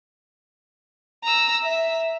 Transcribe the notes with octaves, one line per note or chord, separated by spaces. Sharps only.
A#5 E6
E5